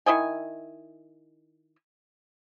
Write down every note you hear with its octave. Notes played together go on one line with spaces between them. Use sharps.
D#3 E4 D#5 G#5